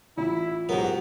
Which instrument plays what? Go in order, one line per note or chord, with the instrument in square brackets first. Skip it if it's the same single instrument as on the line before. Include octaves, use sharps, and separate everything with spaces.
[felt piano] A1 [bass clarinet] E4 [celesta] F4
[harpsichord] G#2 B3 [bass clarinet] F#3 [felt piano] F#4 G4 A#4